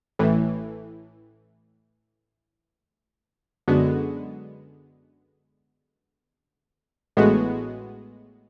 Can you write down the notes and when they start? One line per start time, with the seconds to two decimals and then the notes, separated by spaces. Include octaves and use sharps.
0.19 A1 A2 E3
3.68 F#2 D3 G#3 B3 F#4
7.17 A1 A2 G#3 B3 F#4